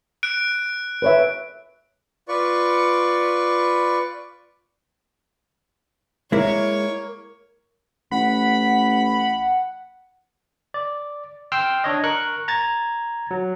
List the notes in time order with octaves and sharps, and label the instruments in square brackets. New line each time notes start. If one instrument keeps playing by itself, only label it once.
[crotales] F#6 D7
[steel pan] B4 C#5 E5
[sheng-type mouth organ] F4 B4 D5 C#6
[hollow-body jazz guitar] G#3 E4 [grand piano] A#3 [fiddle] C#5
[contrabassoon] A1 [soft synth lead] F#5 [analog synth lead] B5
[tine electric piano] D5
G5 C6 E6 F6
D4 C#5 D#5
A#4 C#6 F#6
A#5 G#6 A6
F#3